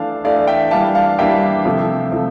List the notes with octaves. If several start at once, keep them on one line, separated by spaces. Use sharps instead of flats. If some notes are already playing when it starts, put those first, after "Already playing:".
Already playing: E3 A3 D4 F5 A5
E3 A3 D4 D5 F5
E5 G5
E3 G3 A#3 D4 F5 A5
F5 A5
E3 G3 A#3 D4 E5 G5
C3 F3 A3
C3 F3 A3